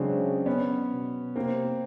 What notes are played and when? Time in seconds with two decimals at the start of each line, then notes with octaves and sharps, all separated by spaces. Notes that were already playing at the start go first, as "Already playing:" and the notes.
Already playing: C#3 F#3 G#3 C4 D4
0.46 B3 C#4
0.91 B2
1.36 C3 A#3 C4